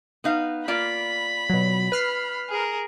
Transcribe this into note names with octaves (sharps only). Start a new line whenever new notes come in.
B3 D#4 F5
A#3 F4 D5 B5
B2 F#3
B4 F6 C7
G#4 A#4